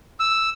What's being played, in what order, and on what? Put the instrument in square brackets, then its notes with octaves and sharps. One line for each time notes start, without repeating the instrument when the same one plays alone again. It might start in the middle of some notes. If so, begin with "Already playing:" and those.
[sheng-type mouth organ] E6